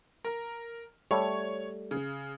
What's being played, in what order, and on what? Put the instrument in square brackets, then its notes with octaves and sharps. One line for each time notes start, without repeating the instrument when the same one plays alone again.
[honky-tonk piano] A#4
[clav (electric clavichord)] G3 A3 [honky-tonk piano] C#5 C#6
[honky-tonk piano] C#3